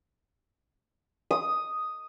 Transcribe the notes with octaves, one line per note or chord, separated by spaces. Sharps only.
D#6